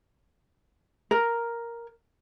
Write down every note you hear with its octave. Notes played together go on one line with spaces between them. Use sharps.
A#4